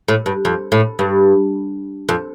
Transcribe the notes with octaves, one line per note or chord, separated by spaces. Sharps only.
A2
G2
F2
A2
G2
F2